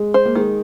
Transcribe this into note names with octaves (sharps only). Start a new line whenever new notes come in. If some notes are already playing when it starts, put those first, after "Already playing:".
Already playing: G#3
C5
A#3
D#3 G#3